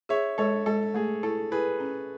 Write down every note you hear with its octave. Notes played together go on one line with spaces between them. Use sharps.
G#4 C#5 E5
G#3 A4 C#5
G#3 A4
A3 G#4
E4 A4
E4 G#4 B4
C#4